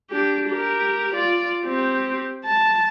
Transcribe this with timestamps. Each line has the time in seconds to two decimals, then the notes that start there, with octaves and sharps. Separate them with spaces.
0.11 D4 G4
0.48 G4 A#4
1.15 F4 D5
1.65 C4 G4
2.44 A5